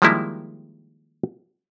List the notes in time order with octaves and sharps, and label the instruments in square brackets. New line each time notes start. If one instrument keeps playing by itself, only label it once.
[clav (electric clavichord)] D#3 F3 G3 G#3 A#3 E4